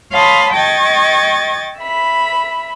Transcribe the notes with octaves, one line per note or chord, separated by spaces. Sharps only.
C#5 F5 A5 B5 C6 D#6
D#5 G5 C#6 G#6 A6
E5 B5